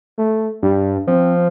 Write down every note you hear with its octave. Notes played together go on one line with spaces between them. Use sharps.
A3
G2 G3
F3 C4